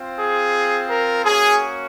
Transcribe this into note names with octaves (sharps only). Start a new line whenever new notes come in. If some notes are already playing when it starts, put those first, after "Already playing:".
Already playing: C4 F4
G#4
A#4
A#3 C#4 F#4 G#4